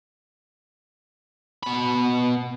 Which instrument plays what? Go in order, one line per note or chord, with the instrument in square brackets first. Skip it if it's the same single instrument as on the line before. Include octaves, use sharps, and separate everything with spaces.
[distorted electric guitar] B2 B5